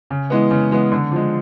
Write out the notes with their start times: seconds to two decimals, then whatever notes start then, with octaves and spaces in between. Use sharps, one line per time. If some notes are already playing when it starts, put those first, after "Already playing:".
0.10 C#3
0.30 E3 G#3 B3
0.51 C#3
0.71 E3 G#3 B3
0.92 D3
1.12 F3 G#3